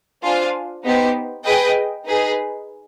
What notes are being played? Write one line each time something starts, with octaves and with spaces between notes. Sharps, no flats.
D4 F4 C5 F5 G#5
B3 D#4 G4 C5
G#4 B4 D#5 G5
D#4 G#4 B4